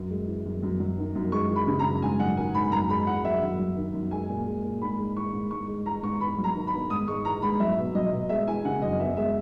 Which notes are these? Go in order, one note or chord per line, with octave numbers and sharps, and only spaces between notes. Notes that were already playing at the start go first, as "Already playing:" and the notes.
Already playing: F#2
G#3
E3
F#2
F#2
F#3
D#3
F#2
G#3 C#6
E3
B5
C#3
A#5
F#2
G#2 G#5
F#3 F#5
D#3 G#5
G#2 B5
F#2 A#5
G#3 B5
E3 F#5
F#2 E5
F#2
F#3
D#3
F#2
G#3 G#5
A#2
G#3
A#2
G#2 B5
G#3
E3 C#6
G#2
G#2 C#6
G#3
E3 A#5
G#2 C#6
E2 B5
F#3
A#5
D#3
B5
E2
G#2 D#6
G#3 C#6
E3 A#5
G#2 B5
F#3 E5
B2
F#3 D#5
B2
G#3 E5
E3 G#5
C#3 F#5
F#2 D#5
E2 E5
G#3 E5